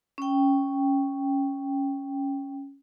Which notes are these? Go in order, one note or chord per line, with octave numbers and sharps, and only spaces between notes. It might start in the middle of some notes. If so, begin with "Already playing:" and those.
C#4 G5